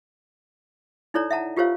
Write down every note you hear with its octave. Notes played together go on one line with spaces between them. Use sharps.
D#4 E4 A4 C#5 D5 A#5
E5 F#5 A5 A#5
F4 G4 A#4 C5 C#5 F5